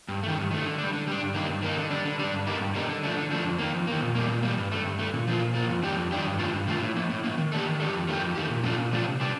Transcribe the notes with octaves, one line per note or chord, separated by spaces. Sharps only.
G2
D#3 A3
G2
D#3 A3
D3
G3 D4
D3
G3 D4
G2
D#3 A#3 D#4
G2
D#3 A#3 D#4
D3
G3 D4
D3
G3 D4
G2
D3 G3 A#3 D#4
G2
D3 G3 A#3 D#4
D3
F3 A3 D4
D3
F3 A3 D4
F2
D#3 A#3
F2
D#3 A#3
A#2
G3 A#3
A#2
G3 A#3
G2
D3 A3
G2
D3 A3
A#2
F3 A#3 F4
A#2
F3 A#3 F4
F2
D#3 G3 D4 G4
F2
D#3 G3 D4 G4
G2
D#3 A3 D4 F4
G2
D#3 A3 D4 F4
A2
F3 A#3
A2
F3 A#3
D#3
A3 D4 G4
D#3
A3 D4 G4
F2
D#3 A3 D#4 G4
F2
D#3 A3 D#4 G4
A#2
F3 A3 D4 F4
A#2
F3 A3 D4 F4
C3
G3 D4 G4